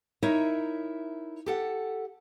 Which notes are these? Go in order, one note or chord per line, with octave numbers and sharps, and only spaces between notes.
D#4 E4 A#4 C#5 E5
G4 A4 F#5